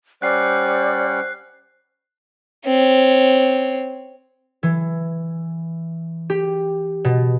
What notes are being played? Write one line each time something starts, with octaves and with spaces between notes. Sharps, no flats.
G3 C#4 C5 D5 F#5 F#6 C7
C4 C#5
E3
G4
B2